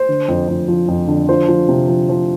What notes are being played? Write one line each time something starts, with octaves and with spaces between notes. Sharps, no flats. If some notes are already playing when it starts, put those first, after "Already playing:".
Already playing: C5
D3
F2
F2
F3
F2
D3
F3 C5
F3
C3
F3
F3